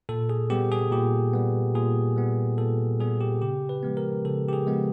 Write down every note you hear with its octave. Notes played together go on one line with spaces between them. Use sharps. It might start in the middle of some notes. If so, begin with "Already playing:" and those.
A#2 A4
G#4
G3 B3 G4
G#4
A#2 G4
G3 B3
A#2 G#4
G3 B3
A#2 A4
G3 B3 G#4
G4
C#3 G4
B4
F3 G#3 B3
A#4
C#3 A4
G4
G#4
F3 G#3 B3